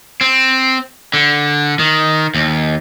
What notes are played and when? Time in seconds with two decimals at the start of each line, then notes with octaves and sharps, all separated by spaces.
0.21 C4
1.14 D3
1.79 D#3
2.35 D#2